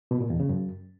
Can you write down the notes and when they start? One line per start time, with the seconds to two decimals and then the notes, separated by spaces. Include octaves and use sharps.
0.11 B2
0.21 A#2
0.30 E2
0.40 C#3
0.49 F#2